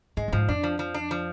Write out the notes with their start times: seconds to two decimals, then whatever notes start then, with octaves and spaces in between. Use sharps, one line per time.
0.17 G#2 G#3
0.28 F2
0.33 G#2 F3
0.48 F2 D4
0.63 F3
0.79 F3
0.94 D4
1.11 F3